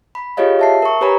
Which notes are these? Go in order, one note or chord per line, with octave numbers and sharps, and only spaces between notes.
B5
F4 G4 G#4 C#5 D#5 F5
E5 A5 C7
A#4 C#6
G4 B4 C#5 G#5 A#5 B5